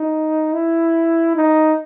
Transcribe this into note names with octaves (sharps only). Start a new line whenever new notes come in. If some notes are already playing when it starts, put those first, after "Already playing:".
Already playing: D#4
E4
D#4